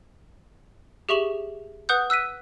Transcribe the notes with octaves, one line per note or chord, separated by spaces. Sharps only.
G4 G#4 E5 C#6 E7 F#7
B4 F#5 D#6 F#6 G6
E6 F#6 B6 D#7